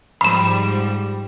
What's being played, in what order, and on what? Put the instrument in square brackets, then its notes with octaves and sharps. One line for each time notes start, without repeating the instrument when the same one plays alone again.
[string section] G#2 F3 G3 [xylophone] B5 E7